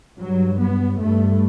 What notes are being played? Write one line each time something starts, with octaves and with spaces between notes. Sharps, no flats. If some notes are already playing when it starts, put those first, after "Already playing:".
G2 F#3
B3
G2 A3